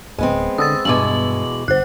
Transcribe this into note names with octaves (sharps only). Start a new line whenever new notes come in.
D1 G#3 B3 C4
D3 D#6 E6 A6
E2 G2 B2 G#3 D6 F#7
G1 C5 F#6